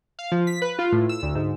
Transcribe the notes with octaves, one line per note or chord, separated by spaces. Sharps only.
F5
F3
B6
B4
F4
A2
E6
D2
G#2